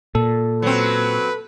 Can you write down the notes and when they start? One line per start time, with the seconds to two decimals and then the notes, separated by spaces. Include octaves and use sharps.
0.15 A#2 A4
0.62 F#3 C4 B4